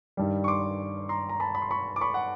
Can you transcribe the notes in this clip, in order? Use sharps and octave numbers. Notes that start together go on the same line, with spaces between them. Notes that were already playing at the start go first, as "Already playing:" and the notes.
G2 D#3 G3
C#6
C6 D6
A#5 C6
A#5
A5 B5
B5
C6
B5 C#6
D6
B5 C#6
F#5